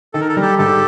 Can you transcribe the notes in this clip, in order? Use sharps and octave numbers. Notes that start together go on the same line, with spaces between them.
D#3 A4
A#4
A4
G3 A#4
G4 A4
G#2 G4 A4